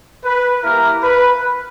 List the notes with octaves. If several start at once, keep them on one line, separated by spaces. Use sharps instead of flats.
B4
A#3 E4 G4 A#4
B4